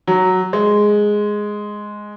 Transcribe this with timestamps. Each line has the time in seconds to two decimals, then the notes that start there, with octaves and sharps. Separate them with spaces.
0.07 F#3
0.53 G#3